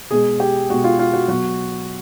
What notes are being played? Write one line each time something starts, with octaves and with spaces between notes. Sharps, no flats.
B2 G#3 G#4
G4
B2 G#3 F#4
F4
F4
F#4
B2 F#3 F#4